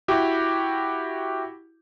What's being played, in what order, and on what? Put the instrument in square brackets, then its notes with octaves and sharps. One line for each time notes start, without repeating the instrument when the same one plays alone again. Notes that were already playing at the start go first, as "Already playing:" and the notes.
[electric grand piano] E4 F#4 G4